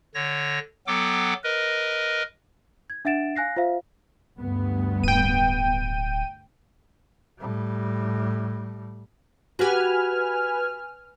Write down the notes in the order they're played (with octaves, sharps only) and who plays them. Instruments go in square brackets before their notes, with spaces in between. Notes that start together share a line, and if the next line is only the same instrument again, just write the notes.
[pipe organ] D3 C#5 A#6
F#3 B3 A4 G5 D6
A#4 B4 D#5
[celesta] G#6
D4 E5 F#5 A6 D7 E7
F5 G#5 F#6 A#6 C7
F4 C5 E5 F5
[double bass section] D2 G2 B3
[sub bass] D1 [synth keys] G5 D#7
[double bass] A2 G3
[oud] F#4 G4 [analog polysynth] B4 G#5 F6